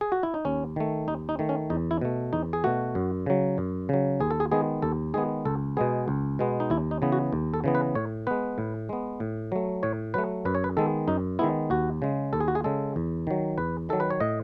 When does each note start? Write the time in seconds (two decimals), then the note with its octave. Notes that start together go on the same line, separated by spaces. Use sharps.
0.01 G#4
0.12 F#4
0.23 E4
0.34 D#4
0.45 D#2 C#4
0.76 D#3 A3
1.08 D#2 D#4
1.29 D#4
1.39 D#3 A3
1.49 C#4
1.70 E2 D#4
1.91 E4
2.01 B2 A3
2.33 E2 D#4
2.53 G#4
2.64 B2 A3 F#4
2.95 F#2
3.26 C#3 F#3
3.58 F#2
3.89 C#3 F#3
4.20 D#2 G#4
4.31 A4
4.40 G#4
4.52 D#3 G#3 B3 G#4
4.82 D#2 A4
5.14 D#3 G#3 B3 G#4
5.45 C#2 A4
5.77 B2 G#3 B3 G#4
6.08 C#2
6.39 B2 G#3 B3
6.60 D#4
6.70 D#2 E4
6.91 D#4
7.02 C#3 E3 B3
7.12 F#4
7.33 D#2
7.54 A4
7.64 C#3 E3 B3
7.75 B4
7.95 A2 C#5
8.27 G#3 B3 B4
8.58 A2
8.89 G#3 B3
9.20 A2
9.52 F#3 A3
9.83 A2 C#5
10.14 F#3 A3 B4
10.45 F#2 B4
10.55 C#5
10.64 B4
10.77 D#3 G#3 B3 A4
11.08 F#2 D#4
11.39 D#3 G#3 B3 E4
11.70 D#2 F#4
12.02 C#3 G#3
12.33 D#2 A4
12.40 G#4
12.48 F#4
12.55 G#4
12.64 C#3 G#3 A4
12.96 E2
13.27 D#3 F#3
13.58 E2 B4
13.89 D#3 F#3 A4
14.00 B4
14.10 C#5
14.20 A2 D#5